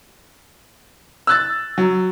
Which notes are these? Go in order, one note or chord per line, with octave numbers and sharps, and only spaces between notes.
E6 F#6 A6
F#3